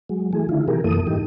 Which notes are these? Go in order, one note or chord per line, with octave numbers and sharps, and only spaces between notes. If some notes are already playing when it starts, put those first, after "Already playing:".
F#3 G#3
E3 A3 G#4
D3 D#3 E4 F4
C3 E3 G4 G#4 A#4
F#2 E3 A#3 A4 D#6
G#2 E3 D#4 G4